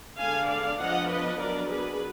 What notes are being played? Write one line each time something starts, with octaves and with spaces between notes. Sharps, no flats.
D3 G#3 B3 D4 F5 G#5
D5 F5
F3 B3 D4 D#5 F#5
B4 D#5
F#3 B3 D4 A#4 D5
G#4 B4